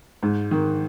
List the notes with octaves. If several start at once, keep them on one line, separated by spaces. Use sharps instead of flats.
G#2
D#3